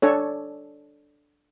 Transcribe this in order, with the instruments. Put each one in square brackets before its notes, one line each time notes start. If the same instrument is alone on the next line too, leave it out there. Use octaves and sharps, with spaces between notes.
[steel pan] D4 A4 C#5